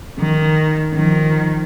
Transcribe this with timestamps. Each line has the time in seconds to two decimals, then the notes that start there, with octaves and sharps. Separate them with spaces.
0.19 D#3
0.94 D#3 F3